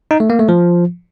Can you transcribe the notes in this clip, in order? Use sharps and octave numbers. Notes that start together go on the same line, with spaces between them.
D#4
A3
A#3
A3
F3